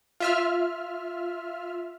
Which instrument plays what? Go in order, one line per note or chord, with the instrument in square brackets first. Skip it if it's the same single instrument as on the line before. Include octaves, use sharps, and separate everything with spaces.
[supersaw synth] F4 E5 F6